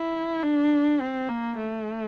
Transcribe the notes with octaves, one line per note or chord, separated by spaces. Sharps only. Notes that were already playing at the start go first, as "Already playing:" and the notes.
Already playing: E4
D4
C4
A#3
A3